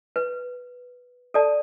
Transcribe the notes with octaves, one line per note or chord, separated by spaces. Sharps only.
B4
A4 D5 A5